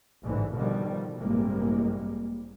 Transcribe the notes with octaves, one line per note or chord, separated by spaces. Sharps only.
A1 G#2 D3 E3
B2 D3 D#3 F3 G3
A1 G2 C3 G3 G#3 A#3